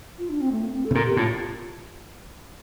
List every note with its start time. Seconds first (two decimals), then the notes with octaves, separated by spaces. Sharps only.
0.19 F4
0.29 D4
0.41 C4
0.51 A3
0.63 A#3
0.73 C4
0.85 A4
0.91 C3
0.95 A#2 A#4
1.05 G4
1.17 A2 F4